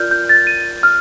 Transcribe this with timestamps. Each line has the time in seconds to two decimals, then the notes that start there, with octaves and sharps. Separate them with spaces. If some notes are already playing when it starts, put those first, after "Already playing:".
Already playing: F4 A#4 D5 F6 G6
0.11 G6
0.29 A6
0.47 D#7
0.83 F6